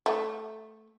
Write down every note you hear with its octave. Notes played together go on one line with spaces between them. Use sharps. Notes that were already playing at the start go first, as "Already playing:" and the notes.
A3